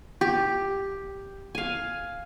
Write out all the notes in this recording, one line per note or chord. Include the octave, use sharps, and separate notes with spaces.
G4
F5 G#5